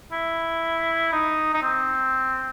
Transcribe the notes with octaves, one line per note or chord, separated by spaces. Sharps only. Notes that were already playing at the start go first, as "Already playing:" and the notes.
E4
D#4
D#4
C4